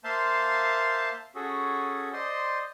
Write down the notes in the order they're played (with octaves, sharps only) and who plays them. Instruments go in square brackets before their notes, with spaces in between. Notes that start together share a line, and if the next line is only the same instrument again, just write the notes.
[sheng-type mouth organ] A#3 C5 E5 F5 A5 C6
C#4 F#4 G#4 A4
C5 D5 D#5 C6